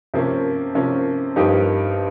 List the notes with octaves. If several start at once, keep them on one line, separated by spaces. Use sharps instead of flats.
C3 F3 A#3 C#4
C3 F3 A#3 C#4
G2 F3 A#3 D#4 G4